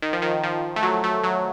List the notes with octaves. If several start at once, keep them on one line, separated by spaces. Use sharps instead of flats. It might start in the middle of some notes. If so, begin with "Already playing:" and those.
D#3
F3
D#3
F3
A3
F#3
A3
F#3